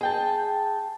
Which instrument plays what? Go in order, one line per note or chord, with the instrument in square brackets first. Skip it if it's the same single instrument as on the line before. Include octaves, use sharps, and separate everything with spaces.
[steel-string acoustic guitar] G#4 G5 A5